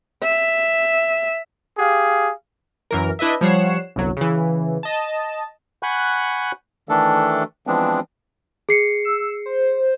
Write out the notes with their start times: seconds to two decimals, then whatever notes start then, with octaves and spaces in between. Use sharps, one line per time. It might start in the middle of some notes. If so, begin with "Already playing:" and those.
0.23 E5
1.77 G4 G#4 F5
2.91 F#2 E3 A#4
3.19 D4 E4 B4 D#5 E5
3.41 F3 G3 C#5 F#5 C7 E7
3.96 G1 C2 F#3
4.17 C#3 E3
4.83 D#5 A5
5.83 F#5 G#5 B5 C#6 F#6 G6
6.89 D#3 E3 A3 D4 A4
7.67 E3 F3 G#3 B3 C4 D4
8.69 G#4 C7 C#7
9.05 E6
9.46 C5